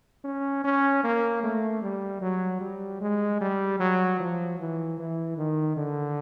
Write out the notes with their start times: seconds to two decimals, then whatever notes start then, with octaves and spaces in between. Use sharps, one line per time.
0.24 C#4
0.64 C#4
1.04 A#3
1.43 A3
1.82 G3
2.21 F#3
2.61 G3
3.01 G#3
3.41 G3
3.80 F#3
4.19 F3
4.59 E3
4.99 E3
5.37 D#3
5.77 D3